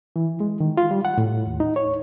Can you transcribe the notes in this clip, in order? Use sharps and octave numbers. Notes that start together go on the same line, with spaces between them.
E3
G#3
D#3
F4
G3
F#5
A2
D#2
D#4
C#5